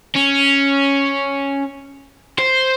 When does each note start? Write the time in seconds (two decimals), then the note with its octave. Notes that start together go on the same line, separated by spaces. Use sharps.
0.15 C#4
2.39 C5